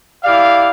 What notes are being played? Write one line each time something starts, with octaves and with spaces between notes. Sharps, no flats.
E4 G4 D5 F5